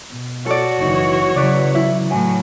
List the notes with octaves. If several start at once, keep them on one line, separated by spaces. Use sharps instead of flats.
B2
F#4 A4 C#5 D5
F#1 E3 D#4
C#3 E3 F#3 B4 D5
E4 E5
A2 F#3 G#5